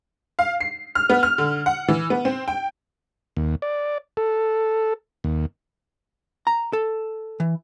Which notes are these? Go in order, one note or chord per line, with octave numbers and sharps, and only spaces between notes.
F5
C7
F6
B3
F6
D3
F#5
E3
B3
C4
G5
D#2
D5
A4
D#2
A#5
A4
E3